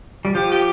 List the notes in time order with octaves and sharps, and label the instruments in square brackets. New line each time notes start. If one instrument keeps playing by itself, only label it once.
[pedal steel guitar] G3
[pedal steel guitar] F3 [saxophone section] G4
[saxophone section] G4